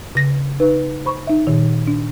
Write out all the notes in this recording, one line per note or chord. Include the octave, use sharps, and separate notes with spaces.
C#3 A#6
D#4 B4
C5 B5 C#6
D#4 E5
A#2 D#3
D4